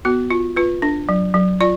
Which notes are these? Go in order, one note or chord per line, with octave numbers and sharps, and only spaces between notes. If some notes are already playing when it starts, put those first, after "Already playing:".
B3 F#4
F4
F4 B4
D4
F#3
F#3
F4 D5